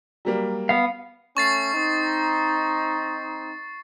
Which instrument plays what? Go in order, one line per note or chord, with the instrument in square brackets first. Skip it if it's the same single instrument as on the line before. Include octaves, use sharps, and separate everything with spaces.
[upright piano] F#3 G3 A#3
[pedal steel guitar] B3 F5
[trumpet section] A3 C#4 [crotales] C#6 A6 C7
[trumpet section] C4 D#4